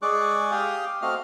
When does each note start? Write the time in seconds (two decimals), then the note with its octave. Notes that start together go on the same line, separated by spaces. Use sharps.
0.02 G#3 G#4 D5 C#6 D6 F#6
0.51 G4 F5 G5 D#6
1.02 A3 C4 F#4 D#5 F5 F6